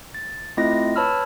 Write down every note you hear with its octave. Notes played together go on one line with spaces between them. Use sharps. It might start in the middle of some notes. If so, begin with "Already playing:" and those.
A6
A3 C4 E4 F4 D#5 A#6
B4 C#5 A5 B5 E6 F6